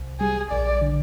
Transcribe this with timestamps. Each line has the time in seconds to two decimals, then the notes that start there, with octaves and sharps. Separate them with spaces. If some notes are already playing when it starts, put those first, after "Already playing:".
Already playing: C2
0.20 G3 G#4
0.51 A#1 D5
0.81 D3